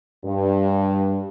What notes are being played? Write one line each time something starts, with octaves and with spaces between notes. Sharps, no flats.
G2